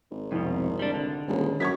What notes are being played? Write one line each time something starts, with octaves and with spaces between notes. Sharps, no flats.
G#1
C2 F2 B2
G3 D4
D3
D#1 D#3 G#3 C#4
F#2 C#6 G#6 B6